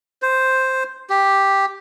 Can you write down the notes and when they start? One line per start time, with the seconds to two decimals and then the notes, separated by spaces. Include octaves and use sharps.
0.22 C5
1.10 G4